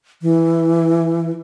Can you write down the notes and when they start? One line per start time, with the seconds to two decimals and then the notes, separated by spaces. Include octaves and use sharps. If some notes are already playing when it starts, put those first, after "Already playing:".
0.22 E3